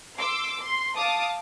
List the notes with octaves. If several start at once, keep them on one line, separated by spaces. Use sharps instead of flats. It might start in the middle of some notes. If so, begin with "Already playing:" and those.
C6 D6 E6
C6
F5 A5 D6 D#6